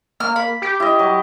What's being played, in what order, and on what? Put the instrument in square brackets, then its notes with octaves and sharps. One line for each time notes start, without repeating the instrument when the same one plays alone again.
[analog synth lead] A#3 [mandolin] F6
[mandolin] B5
[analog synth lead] G4
[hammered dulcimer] E4 D#5
F#3